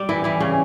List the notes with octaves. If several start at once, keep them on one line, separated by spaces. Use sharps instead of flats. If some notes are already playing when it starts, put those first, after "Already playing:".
Already playing: G3 G4
E3 E4
E3 E4
C#3 C#4